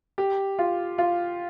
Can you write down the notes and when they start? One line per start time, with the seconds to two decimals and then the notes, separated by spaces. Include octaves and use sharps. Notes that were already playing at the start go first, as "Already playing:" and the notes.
0.18 G4
0.59 F4
0.98 F4